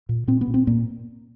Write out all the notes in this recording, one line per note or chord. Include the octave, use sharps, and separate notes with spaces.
A#2
A#2 C4
B3
A#2
C4
A#2 A#3